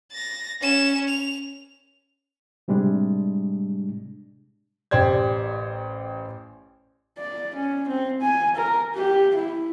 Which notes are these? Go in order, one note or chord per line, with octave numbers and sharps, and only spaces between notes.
A6 A#6
C#4 E7
F7
A2 C3 G3 G#3 D4
A1 G4 C5 D5 G#6
D5
C#4
C4
G#5
A#4
G4
E4